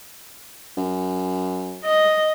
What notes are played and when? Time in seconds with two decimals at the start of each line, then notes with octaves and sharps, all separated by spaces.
0.77 F#2
1.85 D#5